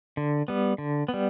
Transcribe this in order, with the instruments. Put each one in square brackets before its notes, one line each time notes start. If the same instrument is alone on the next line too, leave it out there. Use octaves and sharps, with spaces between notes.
[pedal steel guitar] D3
G3 B3
D3
B3
G3